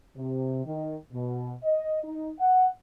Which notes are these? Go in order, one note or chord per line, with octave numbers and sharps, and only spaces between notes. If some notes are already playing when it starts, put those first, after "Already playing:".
C3
D#3
B2
D#5
D#4
F#5